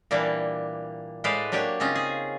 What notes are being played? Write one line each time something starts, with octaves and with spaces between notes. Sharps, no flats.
A#2 E3 G3 A#3 D4
A2 G#3 B4 C5 D5 F5
F#3 A#3 D4 G4 C#5
C#3 C4 C#4 D#4 F4
G#4